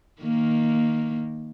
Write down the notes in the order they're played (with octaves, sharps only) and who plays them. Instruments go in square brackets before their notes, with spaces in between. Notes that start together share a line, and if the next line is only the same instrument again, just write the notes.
[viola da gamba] D#3 A#3